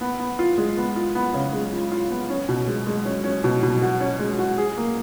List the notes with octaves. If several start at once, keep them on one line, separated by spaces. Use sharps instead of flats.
B3
B3
F4
G#3
B3
F4
B3
C#3
G#3
F4
F4
B3
C#4
B2
G#3
G#3
C#4
C#4
B2
B2
F#4
C#4
G#3
F#4
G#4
A#3